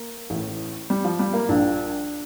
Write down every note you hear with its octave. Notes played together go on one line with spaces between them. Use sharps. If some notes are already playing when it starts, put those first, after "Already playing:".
Already playing: A#3
A1 A2
G3
F3
G3
A#3
A#1 A#2 D4